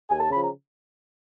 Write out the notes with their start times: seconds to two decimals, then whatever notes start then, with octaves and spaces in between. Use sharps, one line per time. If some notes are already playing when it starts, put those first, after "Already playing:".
0.09 D#2 G#5
0.20 A5
0.30 C#3 F3 B5
0.40 A#5